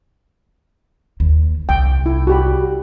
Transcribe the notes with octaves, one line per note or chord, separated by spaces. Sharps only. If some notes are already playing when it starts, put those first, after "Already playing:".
D#2
C2 G5
E4
F#4 G4 B5